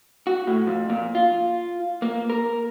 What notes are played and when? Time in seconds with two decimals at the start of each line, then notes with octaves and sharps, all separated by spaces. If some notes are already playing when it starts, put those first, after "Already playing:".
0.27 F#4
0.47 A2
0.67 F2
0.90 A#2
1.15 F4
2.02 A#3
2.30 A#4